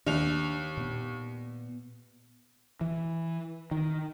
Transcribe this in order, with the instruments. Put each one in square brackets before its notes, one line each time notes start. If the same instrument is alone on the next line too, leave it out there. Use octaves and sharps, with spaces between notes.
[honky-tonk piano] D#2 F7 [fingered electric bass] D4
[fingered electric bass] A#2 B3
E3
D#3